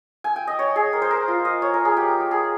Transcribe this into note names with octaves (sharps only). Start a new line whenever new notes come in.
G#5
G5
D#5
C#5
G#4
A#4
C5
A#4
F4
D#5
C#5
A#4
G#4
G4
G4
G#4